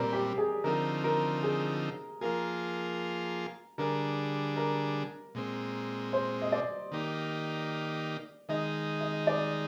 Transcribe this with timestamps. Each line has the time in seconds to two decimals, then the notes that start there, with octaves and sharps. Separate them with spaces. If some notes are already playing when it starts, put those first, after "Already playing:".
Already playing: A#2 G3 C4 A#4 D5
0.13 G4
0.38 G#4
0.64 D3 F3 C4 D#4 A#4
1.04 A#4
1.43 G#4
2.21 F3 A#3 F4 G#4 A#4
3.78 D3 G3 D4 G#4 A#4
4.57 A#4
5.35 A#2 G#3 C4
6.13 C5
6.42 D#5
6.52 D5
6.91 D#3 A#3 D#4 G4
8.49 D#3 G#3 D#4 D#5
9.01 D#5
9.27 D5